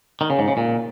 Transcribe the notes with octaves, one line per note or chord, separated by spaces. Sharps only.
D#3
C#3
G#2
C#3
A#2